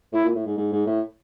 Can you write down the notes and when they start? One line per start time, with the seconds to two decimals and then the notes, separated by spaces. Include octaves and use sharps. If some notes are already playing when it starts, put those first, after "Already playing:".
0.13 A2 E4
0.24 A#2
0.35 A2
0.46 G#2
0.57 G#2
0.72 G#2
0.87 A2